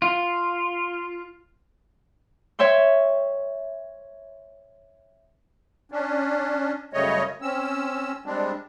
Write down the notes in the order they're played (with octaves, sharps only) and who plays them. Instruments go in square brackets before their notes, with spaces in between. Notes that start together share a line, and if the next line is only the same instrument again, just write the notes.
[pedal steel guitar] F4
[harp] C#5 E5 G5 C6
[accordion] C#4 D4
F#2 C#3 G3 A3 C#5 D#5
C4 C#4 E6
G3 G#3 C4 D4